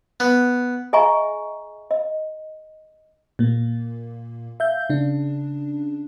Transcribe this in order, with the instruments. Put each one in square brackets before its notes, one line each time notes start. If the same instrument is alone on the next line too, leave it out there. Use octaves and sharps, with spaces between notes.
[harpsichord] B3
[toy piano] G#4 D#5 E5 G#5 A#5 C#6
D#5
[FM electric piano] A#2 A#3
E5 F5 G6
C#3 D4